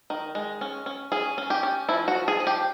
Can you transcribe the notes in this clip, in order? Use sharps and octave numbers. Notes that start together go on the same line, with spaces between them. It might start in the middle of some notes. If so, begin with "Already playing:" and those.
D#3
G#3
C#4
C#4
C#4 G#4
C#4
G4
C#4
F3 E4
F#4
F3
G#4
F3
G4